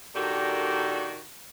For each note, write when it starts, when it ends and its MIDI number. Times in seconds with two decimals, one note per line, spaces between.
0.15 1.19 46
0.15 1.19 51
0.15 1.19 62
0.15 1.19 66
0.15 1.19 67
0.15 1.19 69